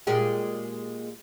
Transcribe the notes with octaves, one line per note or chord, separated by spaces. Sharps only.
A#2 G#3 G4